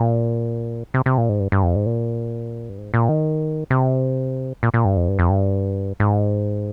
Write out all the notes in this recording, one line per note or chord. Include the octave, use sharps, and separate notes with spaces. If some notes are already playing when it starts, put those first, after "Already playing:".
Already playing: A#2
C3
C3
A#2
G#2
G2
G2
F2
G#2
A#2
G2
G#2
A#2
D#3
C3
A#2
A#2
G2
F2
G2
F2
G2
G#2